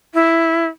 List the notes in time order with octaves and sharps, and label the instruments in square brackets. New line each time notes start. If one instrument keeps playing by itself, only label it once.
[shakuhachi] E4